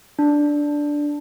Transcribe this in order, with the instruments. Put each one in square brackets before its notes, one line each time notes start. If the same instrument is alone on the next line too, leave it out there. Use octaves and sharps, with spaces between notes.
[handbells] D4